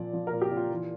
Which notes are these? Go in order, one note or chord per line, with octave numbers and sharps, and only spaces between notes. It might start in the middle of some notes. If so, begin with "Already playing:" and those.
Already playing: A#2 F3 D5
F3
A#4
A#2
G4
A#2
F4
E3